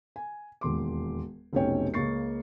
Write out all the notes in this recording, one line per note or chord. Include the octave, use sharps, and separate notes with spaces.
G#5
E1 D#2 C6 D6
F1 B1 C4 C#4 C#5 G5
C#2 C#3 A#3 C#6 A6 C7